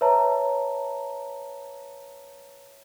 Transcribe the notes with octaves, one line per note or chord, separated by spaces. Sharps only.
B4 C#5 E5 A5 A#5